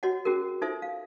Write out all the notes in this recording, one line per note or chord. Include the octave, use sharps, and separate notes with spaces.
F#4 C#5 D#5 F#5
C#4 F#4 G#4 A#4
D#4 F4 A4 C5 E5
F5